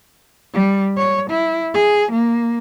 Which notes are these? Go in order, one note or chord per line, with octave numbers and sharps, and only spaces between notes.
G3
C#5
E4
G#4
A#3